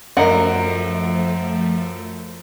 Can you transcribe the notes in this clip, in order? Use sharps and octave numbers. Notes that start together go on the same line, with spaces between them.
F#2 F3 A3 A#4 D#5 F#5